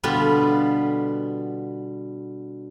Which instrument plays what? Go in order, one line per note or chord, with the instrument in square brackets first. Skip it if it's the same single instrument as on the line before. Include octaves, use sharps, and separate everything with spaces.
[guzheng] B2 D3 G3 B3 F4